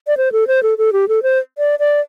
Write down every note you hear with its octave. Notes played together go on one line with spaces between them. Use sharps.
D5
C5
A4
C5
A4
A4
G4
A4
C5
D5
D5